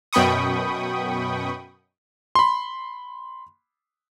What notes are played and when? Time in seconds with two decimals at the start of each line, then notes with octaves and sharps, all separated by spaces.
0.13 F#2 B2 G5 B5 C#6 D#6
2.35 B5 C6